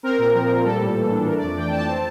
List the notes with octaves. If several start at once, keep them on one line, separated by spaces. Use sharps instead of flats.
C4 A#4
A#2
F3
A#2
G3 A4
A2
E3
D4
A3 A#4
D5
F2
E3 G5
A5
F2
A5
C4